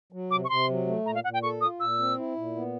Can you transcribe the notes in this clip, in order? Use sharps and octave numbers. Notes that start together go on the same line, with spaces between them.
F#3
C3 D6
C#6
C3 C6
F#3
A3
A#2 A#5
F5
A#2 F#5
G5
A4 C#6
F4 D#6
A#2 E6
C4
E4
A#2
B3